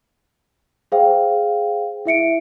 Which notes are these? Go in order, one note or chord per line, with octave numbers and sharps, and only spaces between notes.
G#4 C5 F5 G5
E4 E5 C#7 D7